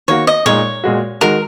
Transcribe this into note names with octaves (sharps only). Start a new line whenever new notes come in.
D#3 A#3 F#4 C#5
D#5
A#2 G#3 D#4 C#5
A#2 G#3 F#4
D#3 G#3 F#4 A#4